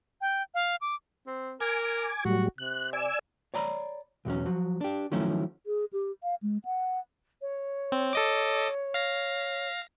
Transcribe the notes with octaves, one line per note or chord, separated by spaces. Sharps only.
G5
F5
D6
C4
A#4 G#5 D6
A2 F#3 G3 F#4
C3 F#6
D5 G#5 E6
C#5 D5 A#5 B5
B1 E2 F#3 C#4
F3 F#3
D4 G4
D#3 F3 F#3 A3 C#4 E4
G#4
G4
F5
G#3
F#5
C#5
C4
A4 D#5 D6
F5 A#6